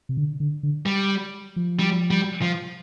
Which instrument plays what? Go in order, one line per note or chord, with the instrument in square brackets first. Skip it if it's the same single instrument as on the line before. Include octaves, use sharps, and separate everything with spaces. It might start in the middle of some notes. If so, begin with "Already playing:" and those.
[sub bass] C3
D3
D3
D3
[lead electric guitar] G3
[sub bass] F3
[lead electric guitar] G3
G3
F3